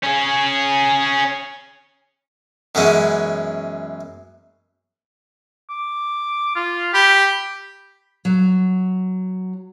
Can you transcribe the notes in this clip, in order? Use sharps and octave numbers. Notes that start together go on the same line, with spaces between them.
C#4 G#4
F#2 B2 E3 G#3 C#4
D6
F4
G4 B5
F#3